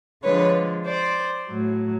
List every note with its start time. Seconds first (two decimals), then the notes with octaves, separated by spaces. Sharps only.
0.23 D3 F3 G#3 B4 C#5
0.85 C5 D5
1.48 A2 F#3